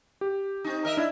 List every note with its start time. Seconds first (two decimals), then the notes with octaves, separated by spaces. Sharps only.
0.21 G4
0.64 C4 D#4
0.85 A#4 D#5 E5
0.97 D4 E4 E5